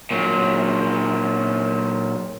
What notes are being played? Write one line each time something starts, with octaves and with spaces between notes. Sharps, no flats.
A#2 F#3